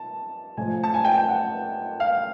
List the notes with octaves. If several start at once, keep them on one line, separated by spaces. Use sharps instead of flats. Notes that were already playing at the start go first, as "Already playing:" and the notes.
Already playing: A5
A2 F3 G#5
A5
G#5
G5
G5
F#5
F5